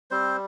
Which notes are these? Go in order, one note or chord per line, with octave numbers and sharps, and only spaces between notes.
G3 C4 C5